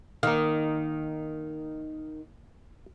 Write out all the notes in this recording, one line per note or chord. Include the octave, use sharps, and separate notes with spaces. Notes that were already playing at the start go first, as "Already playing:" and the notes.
D#3 A#3 F5